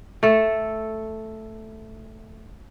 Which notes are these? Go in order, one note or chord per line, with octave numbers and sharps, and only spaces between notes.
A3 A4